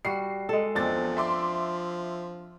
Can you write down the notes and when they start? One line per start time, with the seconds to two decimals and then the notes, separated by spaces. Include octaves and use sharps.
0.05 G3 F#4 C7
0.49 G#3 A4
0.75 E2 F3 C4 D4 A6
1.17 E5 C6 D6